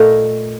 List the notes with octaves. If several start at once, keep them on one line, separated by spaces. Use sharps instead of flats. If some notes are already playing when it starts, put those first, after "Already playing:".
Already playing: A#2 A3 D#4 A#4